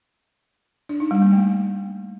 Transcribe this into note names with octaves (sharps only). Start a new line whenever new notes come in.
D4
D#4
G3
A#3
A3